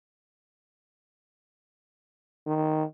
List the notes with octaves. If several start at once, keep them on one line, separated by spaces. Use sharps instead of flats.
D#3